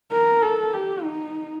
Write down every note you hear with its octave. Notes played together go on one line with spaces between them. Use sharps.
A#4
A4
G4
D#4